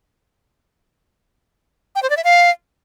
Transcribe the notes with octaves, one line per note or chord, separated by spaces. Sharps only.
G5
C5
D5
E5
F5